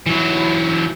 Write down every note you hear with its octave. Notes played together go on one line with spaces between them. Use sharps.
E3 F#3